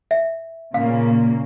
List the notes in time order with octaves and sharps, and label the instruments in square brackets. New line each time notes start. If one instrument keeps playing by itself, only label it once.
[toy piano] E5
[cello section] A#2 C#3 A#3 [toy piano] F5